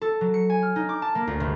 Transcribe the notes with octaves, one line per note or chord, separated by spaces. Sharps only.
A4
F#3
C#7
G#5
F6
D#4
D6
A5
A#3
D2
G1